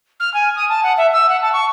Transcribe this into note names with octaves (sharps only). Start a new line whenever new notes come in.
F6
G#5
D#6
A5
F#5
E5
E6
F#5
A5
C#6